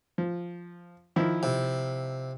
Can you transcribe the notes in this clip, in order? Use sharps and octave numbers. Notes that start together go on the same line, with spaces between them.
F3
D#3 F3 E4
C3